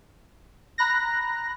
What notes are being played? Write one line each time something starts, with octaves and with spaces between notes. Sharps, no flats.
A#5 B5 F#6 A#6